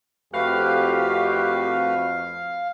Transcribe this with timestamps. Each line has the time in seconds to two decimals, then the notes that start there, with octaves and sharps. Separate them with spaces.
0.33 F2 A3 F#4 G4 B4 F5